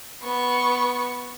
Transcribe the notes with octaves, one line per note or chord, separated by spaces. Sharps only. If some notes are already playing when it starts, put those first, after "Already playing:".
B3 C#6